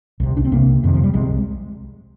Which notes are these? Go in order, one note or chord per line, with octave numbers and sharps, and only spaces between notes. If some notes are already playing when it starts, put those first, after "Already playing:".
C2 C3
D4
C4
C2 C3 A#3
F2 C3 D#3
F3
G3
C2 C3 G#3